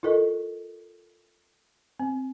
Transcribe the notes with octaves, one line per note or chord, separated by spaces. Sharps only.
E4 F4 A4 A#4 D#5
C4